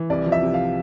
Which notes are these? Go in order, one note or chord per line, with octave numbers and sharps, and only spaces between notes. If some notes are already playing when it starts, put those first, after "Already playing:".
Already playing: E3
C2 D5
F3
E5
C3
F5